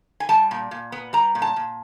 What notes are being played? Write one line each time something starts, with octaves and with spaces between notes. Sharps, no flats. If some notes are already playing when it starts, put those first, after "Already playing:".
G#5
G3 A5
A#2
A#2
B3
G3 A#5
A#2
A5
A#2